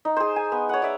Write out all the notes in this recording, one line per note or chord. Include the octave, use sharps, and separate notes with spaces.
D#4
G#4 C5
G#5
B3
C#5 F#5
D5 E5